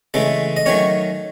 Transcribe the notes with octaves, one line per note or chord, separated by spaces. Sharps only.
C#3 E3 G#3 A3 A4
D#5
D#3 F#3 A3 C#4 C#5